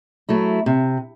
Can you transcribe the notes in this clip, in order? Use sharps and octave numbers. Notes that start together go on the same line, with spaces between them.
F#3 A3 E4
C3